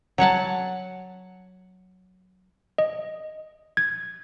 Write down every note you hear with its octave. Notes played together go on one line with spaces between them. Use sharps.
F#3 C#5 F#5 A5
D#5
G#6